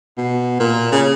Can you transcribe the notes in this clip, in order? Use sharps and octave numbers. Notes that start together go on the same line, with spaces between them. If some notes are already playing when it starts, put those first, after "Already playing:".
B2
A#2
C#3